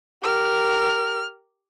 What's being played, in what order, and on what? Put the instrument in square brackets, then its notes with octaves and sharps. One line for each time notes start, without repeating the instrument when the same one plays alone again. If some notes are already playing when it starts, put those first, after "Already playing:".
[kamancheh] G4 A#4 [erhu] F6